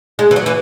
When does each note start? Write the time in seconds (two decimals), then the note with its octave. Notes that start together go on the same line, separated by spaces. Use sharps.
0.19 G#3
0.31 E3
0.36 F#3
0.46 E3